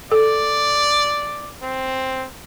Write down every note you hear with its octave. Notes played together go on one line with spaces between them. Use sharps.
A4 D5
C4